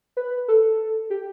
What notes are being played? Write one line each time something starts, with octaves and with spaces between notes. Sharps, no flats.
B4
A4
G4